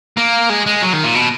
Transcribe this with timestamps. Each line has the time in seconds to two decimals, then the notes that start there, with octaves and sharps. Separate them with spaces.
0.17 A#3
0.49 G#3
0.66 G#3
0.82 F#3
0.93 D#3
1.04 A#2
1.15 B2